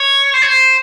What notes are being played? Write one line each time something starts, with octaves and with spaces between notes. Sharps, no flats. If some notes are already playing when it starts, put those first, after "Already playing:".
Already playing: C#5
C5
C#5
C5